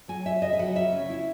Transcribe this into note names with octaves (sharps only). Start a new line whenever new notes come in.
F#3 G#5
F#3 E5
C#3 D#5
E5
F#3 F#5
C#3 E5
C#4
E4